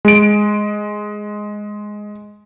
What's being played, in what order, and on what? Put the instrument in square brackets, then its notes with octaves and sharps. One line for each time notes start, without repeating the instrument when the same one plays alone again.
[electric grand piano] G#3 D7